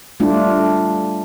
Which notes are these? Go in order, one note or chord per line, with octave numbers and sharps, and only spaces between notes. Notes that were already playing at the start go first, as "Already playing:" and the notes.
G3 A3 D4 F4